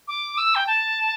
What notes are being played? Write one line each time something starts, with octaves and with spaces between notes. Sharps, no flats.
D6
E6
G5
A5